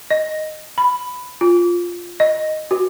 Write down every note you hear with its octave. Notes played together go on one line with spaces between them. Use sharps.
D#5
B5
F4
D#5
F#4